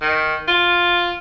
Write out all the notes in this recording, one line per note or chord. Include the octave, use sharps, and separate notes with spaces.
D#3
F4